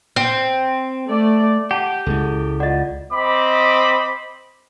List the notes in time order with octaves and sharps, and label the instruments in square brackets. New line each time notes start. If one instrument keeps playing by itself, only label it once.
[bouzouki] C4
[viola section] A3 D5
[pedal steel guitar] G4 [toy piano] F#5 A5
[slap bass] C#2 G#3 [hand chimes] E4 G#4 A4
[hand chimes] F4 D5 [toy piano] D#5 F#5
[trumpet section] C4 D#5 B5 D6